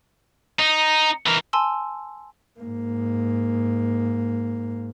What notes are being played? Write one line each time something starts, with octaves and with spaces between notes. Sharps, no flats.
D#4
E3 A#4
G#5 A5 C6 E6
G#2 A#3